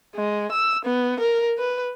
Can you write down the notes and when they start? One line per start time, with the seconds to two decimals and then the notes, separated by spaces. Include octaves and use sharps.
0.15 G#3
0.52 E6
0.86 B3
1.20 A#4
1.59 B4